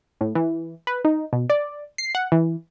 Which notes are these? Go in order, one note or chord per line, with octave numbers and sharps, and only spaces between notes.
A2
E3
B4
D#4
B2
D5
C7
F#5
E3